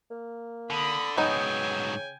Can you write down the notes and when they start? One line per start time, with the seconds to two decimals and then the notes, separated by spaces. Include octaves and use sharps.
0.11 A#3
0.70 D3 B5 D#6
1.17 G#2 C#3 F#3 B3 D#4 G5 G#5